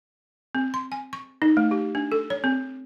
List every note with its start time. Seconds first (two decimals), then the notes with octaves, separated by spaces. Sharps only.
0.55 C4
0.74 C6
0.92 G#5
1.13 C#6
1.42 D#4
1.57 A3
1.71 G4
1.95 D4
2.12 A4
2.30 C#5
2.44 C4